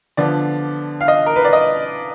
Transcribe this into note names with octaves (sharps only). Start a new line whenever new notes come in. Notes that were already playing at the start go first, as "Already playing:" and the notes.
D3 F3 B3 D5
F5
D#5
A#4
B4
D5
D#5